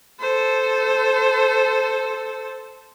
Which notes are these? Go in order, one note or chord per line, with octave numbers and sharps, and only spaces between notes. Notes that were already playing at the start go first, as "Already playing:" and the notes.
A4 C5